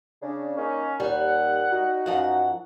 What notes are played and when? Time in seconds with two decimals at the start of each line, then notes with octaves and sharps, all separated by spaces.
0.22 C#3 D4
0.57 A#3 C#4 D#4 C#5
1.00 D#2 G3 F#5
1.71 D#4 F#4
2.06 F#2 F3 F#5